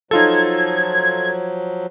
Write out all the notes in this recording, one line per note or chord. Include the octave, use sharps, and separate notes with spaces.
F3 F#3 D#4 F4 A4 G#6